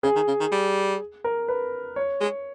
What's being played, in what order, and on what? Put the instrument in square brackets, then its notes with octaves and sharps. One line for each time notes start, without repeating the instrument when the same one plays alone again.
[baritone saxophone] C#3 [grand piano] G#4
[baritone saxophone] D#3
C#3
D#3
G3
[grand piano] A#4
B4
C#5
[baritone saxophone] G#3